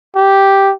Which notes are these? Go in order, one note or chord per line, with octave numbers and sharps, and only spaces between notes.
G4